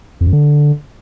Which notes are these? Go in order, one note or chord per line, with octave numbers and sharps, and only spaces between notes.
F2
F#2
D3